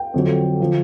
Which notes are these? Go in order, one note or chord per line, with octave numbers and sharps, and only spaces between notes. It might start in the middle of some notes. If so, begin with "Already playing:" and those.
Already playing: G5
F2 D3 F#3
D3 F3